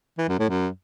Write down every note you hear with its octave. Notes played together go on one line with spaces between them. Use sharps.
E3
F#2
A2
F#2